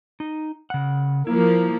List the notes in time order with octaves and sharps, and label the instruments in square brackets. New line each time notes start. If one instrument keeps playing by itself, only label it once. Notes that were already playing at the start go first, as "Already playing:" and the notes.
[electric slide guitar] D#4
C#3 F#5
[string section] F3 A#3 [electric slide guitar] E4